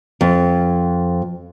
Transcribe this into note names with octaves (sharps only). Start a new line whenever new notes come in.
F2